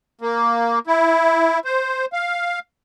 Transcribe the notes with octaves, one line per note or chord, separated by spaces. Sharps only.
A#3
E4
C5
F5